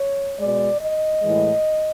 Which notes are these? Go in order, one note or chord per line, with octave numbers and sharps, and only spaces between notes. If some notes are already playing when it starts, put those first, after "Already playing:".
Already playing: C#5
B2 G#3 D5
D#5
A2 E3 G#3